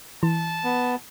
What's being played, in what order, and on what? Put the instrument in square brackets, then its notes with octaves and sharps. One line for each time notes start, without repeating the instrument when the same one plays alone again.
[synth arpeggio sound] E3 [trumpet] A5
[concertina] B3